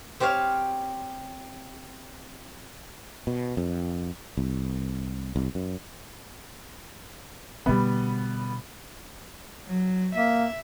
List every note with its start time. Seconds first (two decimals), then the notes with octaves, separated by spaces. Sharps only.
0.20 C4 G4 C5 C#5 F5
3.27 B2
3.57 F2
4.37 C2
5.36 C2
5.55 F#2
7.66 B2 D3 G3 B3
9.67 F#3
10.15 A#3 E5